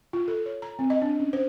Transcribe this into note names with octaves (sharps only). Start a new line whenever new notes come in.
F4
A4
C#5
A#5
C4
D#5
D4
C#4
C5